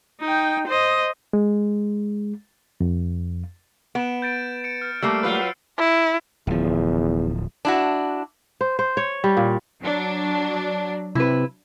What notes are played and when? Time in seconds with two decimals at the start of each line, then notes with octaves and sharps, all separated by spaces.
0.21 D#4 G5
0.67 C5 D#5
1.33 G#3
2.81 F2
3.95 B3 D7 E7
4.22 G6 A6 D7
4.64 C#7 D7
4.82 F6 G6
5.02 G3 A3 A#3 E6 C7
5.23 F#3 F4 B4
5.78 E4
6.47 D1 E2 F3
7.65 D4 E4 F#4
8.61 C5
8.79 C5
8.97 C#5
9.24 G3
9.37 A#2
9.82 F#3 D4
11.15 C3 E4 B4